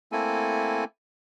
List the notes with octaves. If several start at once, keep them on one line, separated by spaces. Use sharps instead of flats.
A3 A#3 C4 E4 A4 G#5